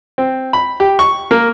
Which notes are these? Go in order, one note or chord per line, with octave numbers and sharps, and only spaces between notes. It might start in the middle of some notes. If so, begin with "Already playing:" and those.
C4
B5
G4
C#6
A#3